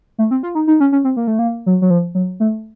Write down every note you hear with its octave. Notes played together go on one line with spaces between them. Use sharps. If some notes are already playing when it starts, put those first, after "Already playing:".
A3
C4
F4
D#4
D#4
C#4
C#4
C4
A#3
A3
A#3
F#3
F#3
F3
F#3
A3